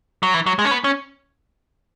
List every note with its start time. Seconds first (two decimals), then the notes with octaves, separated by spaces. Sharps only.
0.23 F#3
0.34 E3
0.46 F#3
0.59 G#3
0.65 C#4
0.71 B3
0.84 C#4